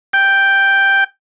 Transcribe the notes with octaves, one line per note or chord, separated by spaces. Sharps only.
G5